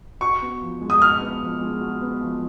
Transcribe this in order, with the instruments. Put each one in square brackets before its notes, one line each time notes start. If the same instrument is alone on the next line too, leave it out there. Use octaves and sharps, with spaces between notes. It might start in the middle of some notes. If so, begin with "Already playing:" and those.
[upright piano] F#4 [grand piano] C#6
[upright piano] B3
F3
G#3
[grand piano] D#6
[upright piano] F#4 [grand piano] F6
[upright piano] B3
F3
G#3
F#4
B3
F3